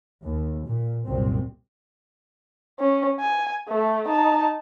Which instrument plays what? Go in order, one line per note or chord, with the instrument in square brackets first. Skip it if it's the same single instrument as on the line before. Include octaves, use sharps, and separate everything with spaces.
[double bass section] D#2
A#2
C2 F#2 A#2 C4
[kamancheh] C#4
G#5
A3
D#4 A5